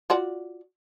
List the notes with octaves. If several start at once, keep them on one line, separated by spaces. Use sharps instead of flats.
F4 F#4 D5